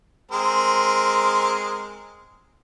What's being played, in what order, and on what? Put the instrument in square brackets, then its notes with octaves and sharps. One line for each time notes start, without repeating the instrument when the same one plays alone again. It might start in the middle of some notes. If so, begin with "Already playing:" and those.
[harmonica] G#3 C4 A#4